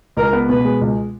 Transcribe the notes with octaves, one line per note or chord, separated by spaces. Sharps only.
C#2 A#4
B3
B2 B4
G#3
C#2